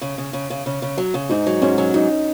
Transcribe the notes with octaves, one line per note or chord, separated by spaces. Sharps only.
C#3
C#3
C#3
C#3
C#3
C#3
F#3
C#3
G#2 D#4
F#3
G#2 C#4
F#3
G#2 D#4